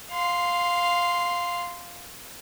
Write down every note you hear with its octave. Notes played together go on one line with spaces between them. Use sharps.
F5 C6